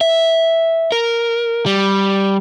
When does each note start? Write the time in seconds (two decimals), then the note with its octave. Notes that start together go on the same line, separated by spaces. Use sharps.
0.01 E5
0.92 A#4
1.66 G3